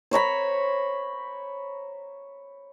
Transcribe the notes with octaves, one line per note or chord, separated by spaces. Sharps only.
C5 C#5 A#5 B5